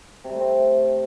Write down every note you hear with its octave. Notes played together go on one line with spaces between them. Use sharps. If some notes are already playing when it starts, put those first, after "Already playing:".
C3
G3
A3
C4